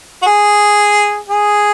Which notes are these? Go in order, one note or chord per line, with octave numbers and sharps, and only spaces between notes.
F#4
G#4
G#4